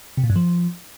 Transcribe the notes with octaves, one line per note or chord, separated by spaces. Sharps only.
C3
A#2
G2
F3